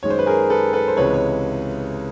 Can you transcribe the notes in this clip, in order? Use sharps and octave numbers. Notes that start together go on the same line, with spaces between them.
F#2 D#3 G#3 C#5
C5
B4
G#4 A#4
A4 B4
A4 B4
C5
C#2 C3 E3 G#3 B4 C#5
C#5